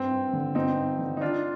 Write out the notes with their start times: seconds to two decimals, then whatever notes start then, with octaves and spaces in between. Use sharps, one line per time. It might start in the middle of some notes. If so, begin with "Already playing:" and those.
Already playing: G2 C4
0.11 G2
0.33 D3
0.55 G2 C4 D#4
0.77 G2
0.99 D3
1.17 D#4
1.21 D#3 D4 F4